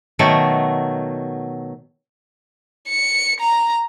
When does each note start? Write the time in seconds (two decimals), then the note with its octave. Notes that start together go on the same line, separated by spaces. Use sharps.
0.19 B2 D#3 F#3 A3
2.89 C#7
3.40 A#5